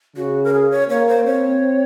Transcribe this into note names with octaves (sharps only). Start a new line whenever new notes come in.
C#3 F#4
A#4
G#4
C#5
A#3 C#5
C5
C4 C#5